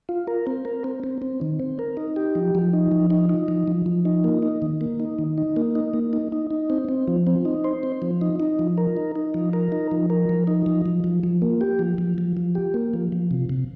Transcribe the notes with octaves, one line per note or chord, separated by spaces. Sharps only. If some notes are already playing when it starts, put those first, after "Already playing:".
F4
A#4
C4
A#4
C4
C4
C4
D#3
C4
A#4
D#4
G4
F3
F3
D#4
F3
D#4
D#4
F3
F3
F3
D#4
A#3
D#4
D#3
A#3
D#4
D#3
D#4
A#3
D#4
A#3
D#4
D#4
D#4
C4
C4
F3
C4
D#4
C5
C4
F3
D#4
D#4
F3
A#4
D#4
D#4
F3
A#4
D#4
F3
A#4
F3
D#4
F3
F3
F3
F3
A#3
G4
F3
F3
F3
F3
G4
A#3
F3
F3
C3
C3